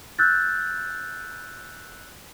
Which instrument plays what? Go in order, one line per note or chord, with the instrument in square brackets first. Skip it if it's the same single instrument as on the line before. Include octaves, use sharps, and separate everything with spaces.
[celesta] E6 F#6 G6 A6